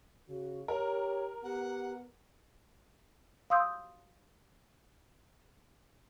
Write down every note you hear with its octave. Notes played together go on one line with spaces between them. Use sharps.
C#3 F#4
G4 A#4 C#5
B3 G4 F#5
F5 C6 D#6 E6 G6